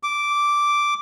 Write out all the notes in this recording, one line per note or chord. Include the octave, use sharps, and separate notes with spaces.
D6